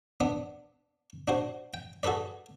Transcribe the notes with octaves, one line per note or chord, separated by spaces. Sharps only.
B3 D4 D6
D4 F#4 C5
G5
F#4 G#4 A4 B4 D5